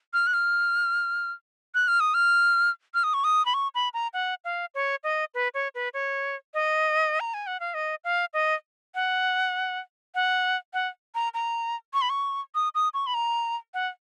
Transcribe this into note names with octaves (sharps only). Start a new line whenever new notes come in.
F6
F#6
F6
F#6
F6
D#6
F6
F6
D#6
C#6
D#6
B5
C#6
B5
A#5
F#5
F5
C#5
D#5
B4
C#5
B4
C#5
D#5
A#5
G#5
F#5
F5
D#5
F5
D#5
F#5
F#5
F#5
A#5
A#5
C#6
B5
C#6
D#6
D#6
C#6
B5
A#5
F#5